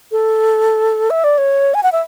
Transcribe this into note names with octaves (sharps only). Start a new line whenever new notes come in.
A4
E5
D5
C#5
G#5
F#5
E5